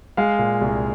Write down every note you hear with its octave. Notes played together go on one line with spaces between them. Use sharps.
G#3 F5
A#2
C2